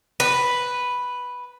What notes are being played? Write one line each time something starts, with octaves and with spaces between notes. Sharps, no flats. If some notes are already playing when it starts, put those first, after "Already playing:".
B4